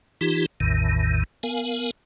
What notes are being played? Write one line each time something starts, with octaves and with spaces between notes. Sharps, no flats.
E3 D#4 F4 G4
A1 E2 A2 D#3
B3 A#4 F5 G#5